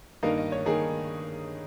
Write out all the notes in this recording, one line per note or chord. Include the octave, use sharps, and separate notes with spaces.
G2 D#3 A#3 D#4 F5
D#5
C#5
D#3 A#3 D#4 G#4